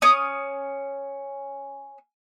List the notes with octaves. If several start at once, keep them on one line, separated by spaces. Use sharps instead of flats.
C#4 D#6